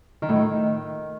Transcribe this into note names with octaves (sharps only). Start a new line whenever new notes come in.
D#3
A2
D#3